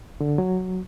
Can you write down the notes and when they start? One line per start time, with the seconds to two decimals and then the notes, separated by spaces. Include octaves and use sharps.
0.21 D3
0.38 F#3